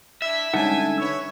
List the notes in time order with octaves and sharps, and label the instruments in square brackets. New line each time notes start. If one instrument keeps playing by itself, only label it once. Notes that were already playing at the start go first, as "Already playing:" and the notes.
[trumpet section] D4 E4 [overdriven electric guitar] E5
[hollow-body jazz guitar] D3 D#4 F#5 [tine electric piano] G3 G#3 C#4 [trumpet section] G#5 A5
[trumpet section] B4 C#5 [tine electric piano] E6